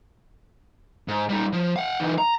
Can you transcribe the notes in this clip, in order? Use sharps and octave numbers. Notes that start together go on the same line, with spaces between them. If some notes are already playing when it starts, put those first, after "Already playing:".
G#2
G3 D#4
F3
F5 F#5
E3 D#4
A#5